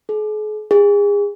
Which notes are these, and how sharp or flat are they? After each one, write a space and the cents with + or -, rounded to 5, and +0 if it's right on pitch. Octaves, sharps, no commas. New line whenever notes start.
G#4 +45
G#4 -30